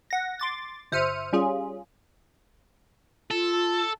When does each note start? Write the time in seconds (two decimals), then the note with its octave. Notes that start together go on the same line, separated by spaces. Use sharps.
0.10 F#5 A#6
0.39 C6 D6 A6
0.92 G1 C5 E5 F6 C#7 D#7
1.33 G3 C#4 F4 G#4
3.31 F4 A4